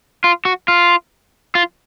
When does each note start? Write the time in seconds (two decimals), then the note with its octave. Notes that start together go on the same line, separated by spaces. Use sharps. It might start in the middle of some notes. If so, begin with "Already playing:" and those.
0.24 F4
0.45 F#4
0.68 F4
1.55 F4